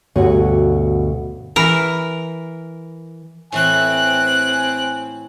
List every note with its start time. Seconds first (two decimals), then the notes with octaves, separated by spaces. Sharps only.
0.16 D2 G2 B2 F#4 C#5
1.56 E3 A#4
3.52 A2 E3 C4 E4 G#5 F#6